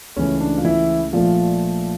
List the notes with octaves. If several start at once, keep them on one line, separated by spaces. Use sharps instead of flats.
C#2 C#3 E3 A3 C#4
D4
F4
E3 E4
A#1 A#2 F3 A3 F4